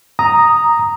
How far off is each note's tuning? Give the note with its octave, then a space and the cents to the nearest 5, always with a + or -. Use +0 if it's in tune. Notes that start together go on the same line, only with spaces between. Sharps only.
A#5 +0 D#6 +0